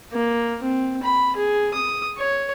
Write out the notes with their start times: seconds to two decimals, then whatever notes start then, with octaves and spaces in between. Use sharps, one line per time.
0.12 A#3
0.62 C4
1.03 B5
1.36 G#4
1.74 D#6
2.18 C#5